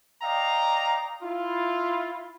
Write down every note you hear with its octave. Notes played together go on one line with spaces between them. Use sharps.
D5 D#5 F5 G5 A#5
E4 F4